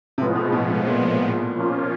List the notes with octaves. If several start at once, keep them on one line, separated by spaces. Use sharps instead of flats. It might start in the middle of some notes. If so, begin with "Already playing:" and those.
A2 C3 F3 G#3 B3
B2
B2
B2
A#2
F3 A#3 C#4 F4